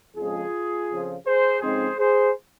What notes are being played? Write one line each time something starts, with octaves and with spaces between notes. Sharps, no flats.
F2 C#3 F3 G#3 F4 G#4
F2 C#3 F3
G#4 C5
F2 C#3 G#3 C4 D#4 G#4 C5
G#4 C5